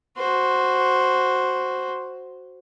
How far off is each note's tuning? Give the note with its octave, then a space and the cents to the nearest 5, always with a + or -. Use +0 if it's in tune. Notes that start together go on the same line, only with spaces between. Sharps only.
F#4 +0 C5 +0